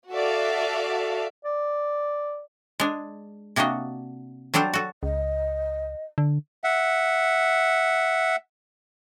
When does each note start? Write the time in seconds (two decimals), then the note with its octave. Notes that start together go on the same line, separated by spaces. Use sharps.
0.10 F#4 A4 D5 E5 F5
1.45 D5
2.80 G#3 D4
3.56 C3 A#3 D4 F#4 D#5
4.54 F#3 G3 D4 A4 C5
4.74 F#4 A4
5.03 C#2 D#5
6.18 D3
6.64 E5 F#5